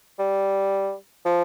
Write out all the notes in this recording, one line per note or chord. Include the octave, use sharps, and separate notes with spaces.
G3
F3